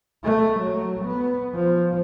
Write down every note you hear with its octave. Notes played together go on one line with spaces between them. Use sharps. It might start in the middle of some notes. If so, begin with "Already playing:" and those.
A3
F#3
B3
F3